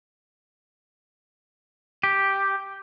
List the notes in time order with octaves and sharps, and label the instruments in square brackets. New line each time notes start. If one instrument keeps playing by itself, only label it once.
[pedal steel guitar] G4